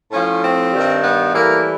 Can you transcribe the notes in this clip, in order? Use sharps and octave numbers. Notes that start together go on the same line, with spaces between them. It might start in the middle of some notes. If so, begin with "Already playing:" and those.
A2 F3 C#4
C4
G2 D#3 G3
B3
A2 E3 G3 A#3